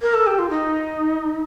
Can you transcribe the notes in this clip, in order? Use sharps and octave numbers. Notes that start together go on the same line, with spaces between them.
A#4
A4
G4
F4
D#4